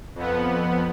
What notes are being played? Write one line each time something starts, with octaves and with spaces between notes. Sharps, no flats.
F2 B3